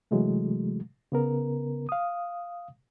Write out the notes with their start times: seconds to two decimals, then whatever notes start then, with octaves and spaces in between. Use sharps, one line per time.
0.11 C3 E3 F#3 G#3 A3
1.12 C#3 B3 A#4
1.89 F5 D#6